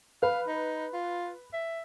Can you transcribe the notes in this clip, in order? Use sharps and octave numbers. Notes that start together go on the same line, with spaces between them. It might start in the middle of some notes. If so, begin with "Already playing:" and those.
B4 F5
D#4
F4
E5